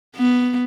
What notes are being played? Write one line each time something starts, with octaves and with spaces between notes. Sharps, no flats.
B3